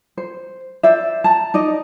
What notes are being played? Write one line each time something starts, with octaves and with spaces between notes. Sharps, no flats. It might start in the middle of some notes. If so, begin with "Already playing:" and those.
C5
C5 D5 E5
A5 A#5
D#4 D5 D#5